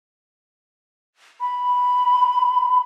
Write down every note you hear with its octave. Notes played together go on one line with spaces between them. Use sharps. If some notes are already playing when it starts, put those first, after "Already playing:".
B5